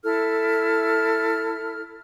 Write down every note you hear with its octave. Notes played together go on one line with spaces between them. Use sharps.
E4 A4 F6